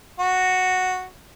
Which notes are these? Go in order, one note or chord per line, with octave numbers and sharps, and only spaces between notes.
F#4